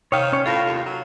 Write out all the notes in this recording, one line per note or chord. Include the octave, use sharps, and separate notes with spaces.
C3 D#3 C#5 F5 G5 D#6
C#4 C#5
A2 F4 A4 F5 A6 A#6
D#2
F#3